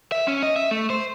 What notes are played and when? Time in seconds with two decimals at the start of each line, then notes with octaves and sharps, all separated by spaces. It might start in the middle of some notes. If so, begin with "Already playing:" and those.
0.12 E5
0.28 C#4
0.43 D#5
0.56 E5
0.71 A3
0.90 C5